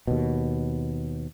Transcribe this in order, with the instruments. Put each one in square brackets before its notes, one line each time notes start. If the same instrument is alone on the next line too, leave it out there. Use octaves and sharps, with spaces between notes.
[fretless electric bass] D#2 B2